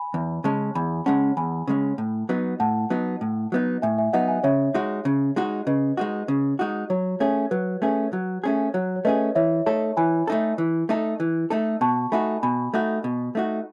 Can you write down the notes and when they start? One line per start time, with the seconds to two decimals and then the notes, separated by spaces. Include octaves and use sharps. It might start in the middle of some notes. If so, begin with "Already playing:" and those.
Already playing: G#5 B5
0.14 E2
0.44 C#3 G#3 C#4 A5 C#6
0.75 E2 G#5 B5
1.06 C#3 G#3 C#4 F#5 A5
1.37 E2 G#5 B5
1.67 C#3 G#3 C#4
1.98 A2
2.29 F#3 B3 D#4
2.60 A2 F#5 A5
2.90 F#3 B3 D#4
3.21 A2
3.52 F#3 B3 D#4
3.82 A2 E5 G#5
3.98 E5 G#5
4.13 F#3 B3 D#4 D#5 F#5
4.28 E5 G#5
4.43 C#3 C#5 E5
4.74 G#3 D#4 F#4
5.05 C#3
5.36 G#3 D#4 F#4
5.67 C#3 B4 D#5
5.97 G#3 D#4 F#4
6.28 C#3
6.59 G#3 D#4 F#4
6.90 F#3 C#5
7.20 A3 C#4 G#4 C#5
7.51 F#3 B4
7.82 A3 C#4 G#4 B4
8.13 F#3
8.44 A3 C#4 G#4
8.74 F#3 C#5
8.96 C#5
9.05 A3 C#4 G#4 B4 D#5
9.35 E3 C#5 E5
9.66 A3 D#4 A4 C#5 E5
9.97 E3 G#5 B5
10.27 A3 D#4 A4
10.58 E3
10.89 A3 D#4 A4
11.20 E3
11.50 A3 D#4 A4
11.81 B2 A5 C#6
12.12 A3 D#4 F#4 G#5 B5
12.43 B2 G#5 B5
12.74 A3 D#4 F#4
13.04 B2
13.35 A3 D#4 F#4